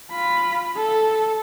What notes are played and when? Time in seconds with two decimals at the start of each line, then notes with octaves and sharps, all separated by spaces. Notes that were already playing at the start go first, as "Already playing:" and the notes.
0.11 F4 B5
0.76 A4